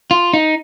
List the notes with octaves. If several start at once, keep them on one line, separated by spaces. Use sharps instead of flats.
F4
D#4